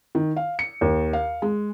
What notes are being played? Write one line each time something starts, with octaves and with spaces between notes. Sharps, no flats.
D#3
F5
C#7
D#2
F5
G#3